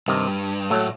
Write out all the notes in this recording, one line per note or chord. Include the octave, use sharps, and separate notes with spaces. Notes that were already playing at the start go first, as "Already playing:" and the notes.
G2 C3 D#3
A2 F#3 A3